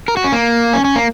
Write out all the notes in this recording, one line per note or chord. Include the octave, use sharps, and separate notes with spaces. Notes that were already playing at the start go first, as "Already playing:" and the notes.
A#4
F#4
C#4
A#3
C#4
C#4
A#3